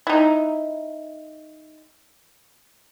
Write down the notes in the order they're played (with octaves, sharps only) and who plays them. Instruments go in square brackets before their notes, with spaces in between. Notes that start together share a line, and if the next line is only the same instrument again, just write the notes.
[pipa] D#4 E4